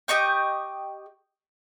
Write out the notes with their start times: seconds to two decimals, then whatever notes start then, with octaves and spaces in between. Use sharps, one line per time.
0.08 G4 D#5 C#6 G6